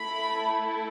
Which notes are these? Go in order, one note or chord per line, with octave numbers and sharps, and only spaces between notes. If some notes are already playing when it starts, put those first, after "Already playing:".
Already playing: A3 E4 A4 B5